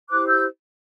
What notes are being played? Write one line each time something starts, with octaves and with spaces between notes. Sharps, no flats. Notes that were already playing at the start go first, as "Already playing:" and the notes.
E4 G4 C5 D6 F#6
E6 G6